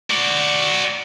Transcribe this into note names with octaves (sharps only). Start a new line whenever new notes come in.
F#4 D5